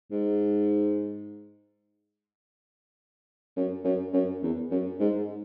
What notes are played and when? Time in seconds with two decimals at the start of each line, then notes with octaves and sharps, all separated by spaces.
0.11 G#2
3.57 F#2
3.84 F#2
4.13 F#2
4.43 E2
4.71 F#2
5.00 G#2